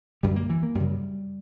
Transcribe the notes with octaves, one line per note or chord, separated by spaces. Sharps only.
F#2 D3 G3
A#3
E3
A#3
F#2 C#3 G3